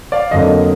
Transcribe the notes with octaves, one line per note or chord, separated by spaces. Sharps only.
D5 F5
F2 D3 F#3 A#3 D#5